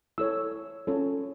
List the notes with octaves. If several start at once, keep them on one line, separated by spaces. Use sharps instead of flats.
E4 A4 C#5 E6
C#4 F4 A4 C#5